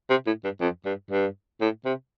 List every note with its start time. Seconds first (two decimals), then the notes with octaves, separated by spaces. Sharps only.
0.10 C3
0.26 A2
0.44 G2
0.61 F2
0.85 G2
1.11 G2
1.61 A2
1.85 C3